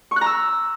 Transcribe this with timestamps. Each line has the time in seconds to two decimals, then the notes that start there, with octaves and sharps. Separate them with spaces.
0.11 C#6
0.16 F#6
0.21 A#5
0.26 E6